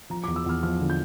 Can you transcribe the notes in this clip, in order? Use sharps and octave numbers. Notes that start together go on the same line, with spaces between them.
F3 A#5
D6
E2
E6
E2 F6
F3 F6
D3
G6